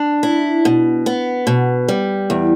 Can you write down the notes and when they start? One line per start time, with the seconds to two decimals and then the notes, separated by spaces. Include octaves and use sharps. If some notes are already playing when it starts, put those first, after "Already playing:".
Already playing: D4
0.23 E4
0.65 B2
1.06 B3
1.47 B2
1.88 G3
2.30 E2